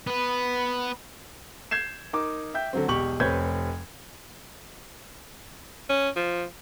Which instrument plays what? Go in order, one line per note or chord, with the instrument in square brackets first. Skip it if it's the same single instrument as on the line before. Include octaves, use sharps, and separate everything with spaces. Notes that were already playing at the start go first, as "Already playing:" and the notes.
[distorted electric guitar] B3 B4
[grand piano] G6 G#6 C7 E7
D#4 A#4 D6
E5 G5 G6
D3 F#3 C4
E1 B1 G4 C#6 F#7
F1 C4 B4 C#5 G6 G#6
[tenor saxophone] C#4
F3